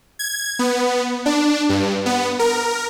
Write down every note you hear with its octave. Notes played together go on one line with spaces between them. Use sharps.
G#6
B3
D4
G2
B3
A#4